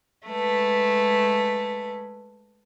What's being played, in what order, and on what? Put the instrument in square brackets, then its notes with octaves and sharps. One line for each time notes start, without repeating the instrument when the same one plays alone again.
[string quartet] G#3 A3 B4